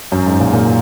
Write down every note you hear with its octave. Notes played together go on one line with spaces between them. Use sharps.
F#2
G#2
A#2
A#2